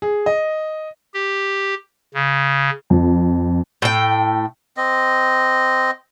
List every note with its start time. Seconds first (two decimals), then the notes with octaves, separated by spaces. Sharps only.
0.02 G#4
0.26 D#5
1.14 G4
2.14 C#3
2.90 F2
3.82 A2 G5
4.77 C4 D#5